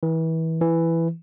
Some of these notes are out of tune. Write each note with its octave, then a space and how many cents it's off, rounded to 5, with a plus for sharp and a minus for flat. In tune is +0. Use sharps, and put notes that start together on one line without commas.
E3 -30
E3 +5